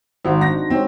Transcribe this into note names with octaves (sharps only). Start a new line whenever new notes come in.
G#1 F#4 C5
C4 D4 D#4 A#6
G#3 C4 C#5